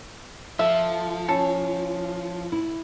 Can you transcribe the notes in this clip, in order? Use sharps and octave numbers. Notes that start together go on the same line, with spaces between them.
F3 A4 E5
C#4 E4 A4
E4